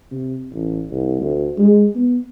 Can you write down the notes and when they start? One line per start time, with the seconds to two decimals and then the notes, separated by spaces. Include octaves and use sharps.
0.11 C3
0.53 A1
0.91 C2
1.21 D2
1.58 G#3
1.95 B3